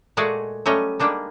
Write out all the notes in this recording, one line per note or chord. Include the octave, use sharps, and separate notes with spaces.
A#2 G#3 A3 F#4 G#4 D5
F#3 G3 A3 C#4 D#5
G3 G#3 A#3 D4 D#4